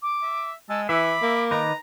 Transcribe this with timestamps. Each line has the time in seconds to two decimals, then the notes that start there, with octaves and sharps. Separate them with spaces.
0.02 D6
0.22 E5
0.69 G#3 A5 E6
0.89 E3 E5 B5 D6
1.22 A#3
1.51 D#3 D#4 B4 A#5